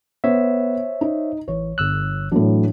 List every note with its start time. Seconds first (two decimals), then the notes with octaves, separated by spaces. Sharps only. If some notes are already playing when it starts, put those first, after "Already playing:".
0.24 B3 C5 C#5 E5
1.01 D#4
1.48 A1 E3 C#5
1.78 G1 E6 F#6
2.32 A2 E3 F#3 D4